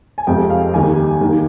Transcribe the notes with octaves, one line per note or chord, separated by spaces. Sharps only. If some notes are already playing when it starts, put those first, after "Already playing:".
G#5
F1 F2 C3 F3 G#3 G5
F5
D#2 D#3 G3 G#5
D#2 D#3 A#3